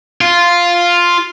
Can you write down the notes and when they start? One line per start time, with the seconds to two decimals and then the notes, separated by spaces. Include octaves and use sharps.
0.21 F4